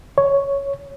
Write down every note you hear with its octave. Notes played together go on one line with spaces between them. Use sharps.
C#5